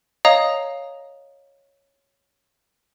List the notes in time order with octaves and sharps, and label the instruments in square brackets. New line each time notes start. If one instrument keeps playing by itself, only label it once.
[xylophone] C#5 D#5 F5 A#5 D#6